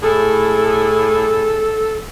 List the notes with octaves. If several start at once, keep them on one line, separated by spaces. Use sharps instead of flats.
A2 G#4 A4